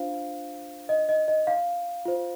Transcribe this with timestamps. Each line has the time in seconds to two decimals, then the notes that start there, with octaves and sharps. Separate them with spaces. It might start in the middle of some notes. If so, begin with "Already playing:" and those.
Already playing: D4 F4 C5 F5
0.89 D#5
1.09 D#5
1.28 D#5
1.47 F5
2.05 F4 C5